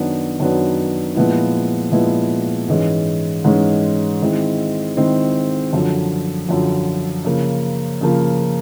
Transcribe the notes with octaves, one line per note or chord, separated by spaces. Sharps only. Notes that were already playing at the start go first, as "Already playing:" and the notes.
Already playing: F#2 D#3 F#3 B3 D4
F#2 D#3 F#3 B3 D4
A#2 F3 G#3 B3 E4
A#2 F3 G#3 B3 E4
G#2 E3 G#3 C#4
G#2 E3 G#3 C#4
D#3 G#3 C4 E4
D#3 G#3 C4 E4
F#2 D3 F3
F#2 D3 F3
C#3 F3 A#3
C#3 F3 A#3